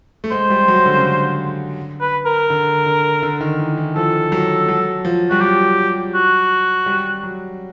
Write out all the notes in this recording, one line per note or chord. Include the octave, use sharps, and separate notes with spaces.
A3
G#3 C5
G3
F#3
D3
C#3
D3
B4
A#4
D3
D3
D3
D#3
E3
E3
F3 A4
F#3
F#3
F3
G3 F#4
F#3 G4
F#4
G3
F#3